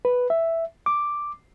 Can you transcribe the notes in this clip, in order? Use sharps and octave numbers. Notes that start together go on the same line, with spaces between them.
B4
E5
D6